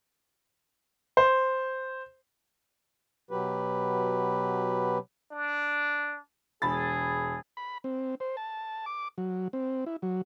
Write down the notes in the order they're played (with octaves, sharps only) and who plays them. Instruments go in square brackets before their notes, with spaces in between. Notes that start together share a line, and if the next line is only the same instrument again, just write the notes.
[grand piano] C5
[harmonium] B2 F#3 G4 B4
[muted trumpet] D4
[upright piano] E1 B5 A6 [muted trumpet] G#4
[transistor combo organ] B5
C4
C5
A5
D6
F#3
C4
E4
F#3